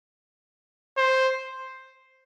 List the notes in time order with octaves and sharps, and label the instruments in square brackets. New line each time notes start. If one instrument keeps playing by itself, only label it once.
[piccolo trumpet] C5